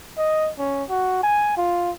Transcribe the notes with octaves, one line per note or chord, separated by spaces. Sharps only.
D#5
C#4
F#4
G#5
F4